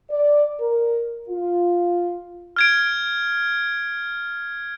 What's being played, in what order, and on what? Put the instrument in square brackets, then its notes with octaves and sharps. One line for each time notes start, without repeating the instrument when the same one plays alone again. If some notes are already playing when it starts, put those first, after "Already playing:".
[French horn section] D5
A#4
F4
[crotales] F6 G#6 D7